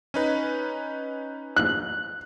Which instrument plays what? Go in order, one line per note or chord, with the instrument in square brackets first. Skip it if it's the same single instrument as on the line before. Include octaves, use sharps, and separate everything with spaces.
[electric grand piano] C#4 D#4 B4
[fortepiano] F#6